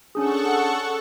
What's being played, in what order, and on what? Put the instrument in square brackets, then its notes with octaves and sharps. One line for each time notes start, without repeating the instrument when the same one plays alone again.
[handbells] C#4 D4 G#4 [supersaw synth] A4 F#5 C#6